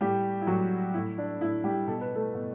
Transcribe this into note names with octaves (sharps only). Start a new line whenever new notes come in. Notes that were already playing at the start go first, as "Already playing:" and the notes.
A2 G3 G4
E4
A2 F#3 F#4
A2 E4
D4
A2 E4
G3 G4
B2 A4
B4
A3 A4
B2